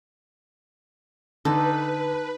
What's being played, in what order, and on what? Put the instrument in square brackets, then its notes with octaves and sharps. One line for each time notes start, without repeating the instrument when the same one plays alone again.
[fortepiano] D3 [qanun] D#4 [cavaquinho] A4 [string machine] B4